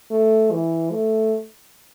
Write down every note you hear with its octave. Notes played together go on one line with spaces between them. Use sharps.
A3
E3
A3